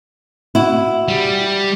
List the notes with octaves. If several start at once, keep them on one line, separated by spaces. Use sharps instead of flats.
E4 F#4
G3